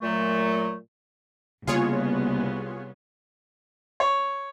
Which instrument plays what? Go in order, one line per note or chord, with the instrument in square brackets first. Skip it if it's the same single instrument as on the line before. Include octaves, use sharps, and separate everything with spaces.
[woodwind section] A#2 F#3 A3
[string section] C2 B3 [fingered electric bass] C#3 A#3 [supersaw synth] F4 G#4 C#5
[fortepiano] C#5